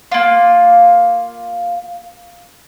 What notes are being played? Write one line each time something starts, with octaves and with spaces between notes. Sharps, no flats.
A#3 F4